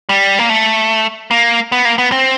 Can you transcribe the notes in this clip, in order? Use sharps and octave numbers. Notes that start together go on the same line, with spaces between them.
G3
A#3
A3
A#3
B3
A#3
B3
C4